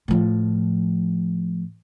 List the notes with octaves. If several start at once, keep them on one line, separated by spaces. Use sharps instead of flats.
A2 F3